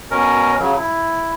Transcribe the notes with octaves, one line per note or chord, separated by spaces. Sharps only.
B2 C#4 A#4
C#3 F#3
E4